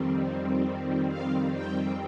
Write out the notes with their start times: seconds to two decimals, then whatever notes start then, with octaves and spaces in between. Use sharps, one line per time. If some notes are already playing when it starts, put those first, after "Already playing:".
Already playing: F2 D#3 G3 C4
1.08 F5
1.54 G5